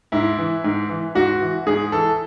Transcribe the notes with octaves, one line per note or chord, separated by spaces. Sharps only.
G#2 E4
E3
G#2
E3
G#2 F#4
E3
G#2 G#4
E3 A4